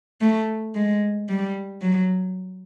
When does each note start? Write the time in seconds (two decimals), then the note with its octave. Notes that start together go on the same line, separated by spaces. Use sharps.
0.21 A3
0.75 G#3
1.29 G3
1.82 F#3